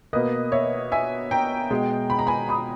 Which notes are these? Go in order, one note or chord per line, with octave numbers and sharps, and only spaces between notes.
B2 A#3 B4 D#5
C#5 E5
E5 G#5
G5 A#5
B2 G#3
B5
A#5
G#5 B5
B5 D#6